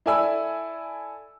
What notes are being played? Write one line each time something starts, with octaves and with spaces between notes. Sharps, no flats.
E4 A4 D5 G#5 B5 E6